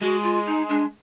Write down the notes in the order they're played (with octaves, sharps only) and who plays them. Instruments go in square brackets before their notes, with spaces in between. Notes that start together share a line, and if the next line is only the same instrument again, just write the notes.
[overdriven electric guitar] G#3 [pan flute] F#4
[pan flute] F4
D#4
D4